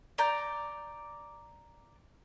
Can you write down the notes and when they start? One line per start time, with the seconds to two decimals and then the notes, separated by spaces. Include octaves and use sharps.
0.18 D5 A#5 G6